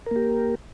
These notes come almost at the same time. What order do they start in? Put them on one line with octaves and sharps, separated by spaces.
A#4 A#3 G4